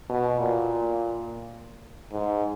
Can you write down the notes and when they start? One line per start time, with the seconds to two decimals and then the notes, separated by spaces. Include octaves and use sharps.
0.09 B2
0.39 A#2
2.12 G#2